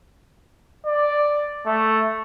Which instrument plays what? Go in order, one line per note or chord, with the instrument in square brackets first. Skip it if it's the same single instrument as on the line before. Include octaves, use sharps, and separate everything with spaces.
[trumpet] D5
A3